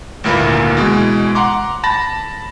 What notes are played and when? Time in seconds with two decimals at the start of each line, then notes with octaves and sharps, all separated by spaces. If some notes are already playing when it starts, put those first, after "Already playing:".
0.24 G#1 D2 A#2 A#3 E4 B4
0.77 B2 E3 G#3
1.35 F#5 A#5 C6 D6
1.84 A5 B5 A6 A#6